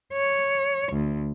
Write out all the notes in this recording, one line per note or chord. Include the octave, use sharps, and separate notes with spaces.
C#5
D2